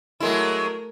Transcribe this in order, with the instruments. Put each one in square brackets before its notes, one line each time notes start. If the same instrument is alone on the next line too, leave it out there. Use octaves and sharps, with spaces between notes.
[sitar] F#3 G#3 E4 [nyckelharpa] A3 A#4